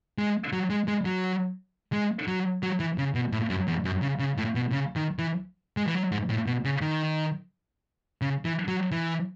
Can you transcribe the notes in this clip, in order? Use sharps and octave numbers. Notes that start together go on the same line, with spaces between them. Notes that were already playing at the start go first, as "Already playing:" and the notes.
G#3
F#3
G#3
G#3
F#3
G#3
F#3
F#3
E3
C#3
B2
A2
F#2
E2
F#2
C#3
C#3
A2
B2
C#3
D#3
E3
G#3
E3
F#3
G#2
A2
B2
C#3
D#3
C#3
E3
F#3
E3